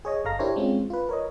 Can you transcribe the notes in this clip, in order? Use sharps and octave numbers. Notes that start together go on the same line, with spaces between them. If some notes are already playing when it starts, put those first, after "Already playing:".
G#4 C#5 D#5
G1 A4 F5 A#5 A#6
D4 E4 G4 A#4 C5 C#5
G#3 C4 C#4 F4
F4 B4
A#4 C#5 D#5